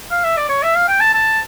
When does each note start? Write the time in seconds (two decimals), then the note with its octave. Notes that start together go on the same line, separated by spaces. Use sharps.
0.11 F5
0.24 E5
0.37 D5
0.49 C#5
0.63 E5
0.75 F5
0.88 G5
1.00 A5
1.14 A5